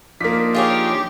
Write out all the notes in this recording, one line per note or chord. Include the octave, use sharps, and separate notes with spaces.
F3 A#3 D4 D#4 B6
F4 G4 G#4 C#5